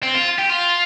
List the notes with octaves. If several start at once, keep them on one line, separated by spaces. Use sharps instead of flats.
C4
F4
G4
F4